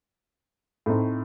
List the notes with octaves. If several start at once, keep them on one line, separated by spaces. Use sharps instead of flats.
A2 A3 C4 D#4